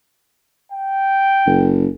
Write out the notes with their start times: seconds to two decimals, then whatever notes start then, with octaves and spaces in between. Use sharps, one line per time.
0.72 G5
1.47 F#1